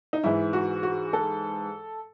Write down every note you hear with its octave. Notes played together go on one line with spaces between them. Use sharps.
D#4
G#2 E3 E4
F#4
F#4
A4